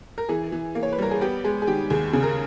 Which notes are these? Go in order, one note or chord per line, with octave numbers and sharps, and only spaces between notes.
A#4
E3 G#4
E3
A#3
C#5
B4
G3 A#4
G#4
B3 G4
G#3 G#4
G#4
D#3 G4
D#2 G#4
C#3 G#4
A#4